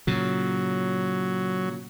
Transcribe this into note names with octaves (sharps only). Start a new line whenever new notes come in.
A#2 C#3 F#3